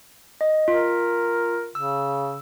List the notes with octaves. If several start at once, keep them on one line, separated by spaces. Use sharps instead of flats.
D#5
F4 A#4
C#3 E6